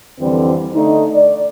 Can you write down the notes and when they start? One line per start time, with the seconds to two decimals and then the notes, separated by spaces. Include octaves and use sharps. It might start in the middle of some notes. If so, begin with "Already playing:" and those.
0.19 F2 D3 E3 G3 C4
0.73 D3 A3 D#4
1.13 D5